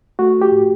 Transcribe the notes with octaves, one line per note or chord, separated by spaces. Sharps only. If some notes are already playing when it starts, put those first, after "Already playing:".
A3 F#4
G4
A2